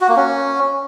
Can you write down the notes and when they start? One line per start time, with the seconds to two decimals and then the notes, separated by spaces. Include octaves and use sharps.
0.01 F#4
0.09 A#3
0.16 C#4